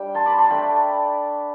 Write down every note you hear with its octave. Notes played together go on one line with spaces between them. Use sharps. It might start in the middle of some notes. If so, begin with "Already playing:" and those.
Already playing: G3 D4 G5
A5 C6
B5 D6
A5 C6
A3 D4 G5 B5